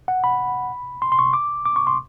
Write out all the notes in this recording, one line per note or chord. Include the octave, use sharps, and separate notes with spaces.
F#5
B5
C6
C6
C#6
D6
D6
C#6
C6